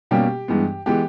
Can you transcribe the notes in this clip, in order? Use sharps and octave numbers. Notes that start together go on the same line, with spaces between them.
B2 G3 A#3 C#4 G4
G2 E3 G#3 B3
E3 G#3 B3 G4